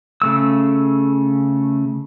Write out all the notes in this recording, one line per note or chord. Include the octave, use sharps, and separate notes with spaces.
C#3 A3 E6